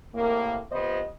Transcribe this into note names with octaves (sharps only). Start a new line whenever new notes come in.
A2 C3 A#3
C3 F3 B3 C5 D#5